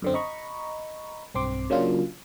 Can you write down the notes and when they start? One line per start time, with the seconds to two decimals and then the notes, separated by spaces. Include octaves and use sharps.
0.02 F#2 D3 C4
0.14 D#5 A#5 B5 C#6
1.35 B1 G2 C4 C6 D6
1.70 C#3 F#3 A#3 C#4 D4 F4